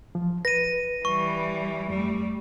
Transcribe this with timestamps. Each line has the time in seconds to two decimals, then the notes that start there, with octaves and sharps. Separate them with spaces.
0.15 F3
0.45 B4 A#6 D#7
1.05 E3 G3 C#6
1.90 F2 G3 A3